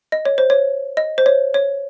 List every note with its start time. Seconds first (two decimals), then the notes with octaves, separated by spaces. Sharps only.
0.12 D#5
0.25 C#5
0.38 C5
0.50 C#5
0.97 D#5
1.18 C5
1.26 C#5
1.54 C#5